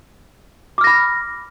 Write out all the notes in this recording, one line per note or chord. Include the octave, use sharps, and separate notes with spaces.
B5 D6 F6 A#6